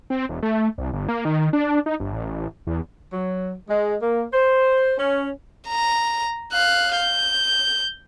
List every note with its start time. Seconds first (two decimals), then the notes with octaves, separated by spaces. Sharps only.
0.10 C4
0.29 E1
0.43 A3
0.78 C2
0.93 G1
1.09 A#3
1.25 D#3
1.53 D4
1.86 D#4
2.00 G1
2.13 A1
2.67 E2
3.12 F#3
3.68 G#3
4.01 A#3
4.32 C5
4.98 C#4
5.69 A#5
6.52 F5 F#6
6.96 G6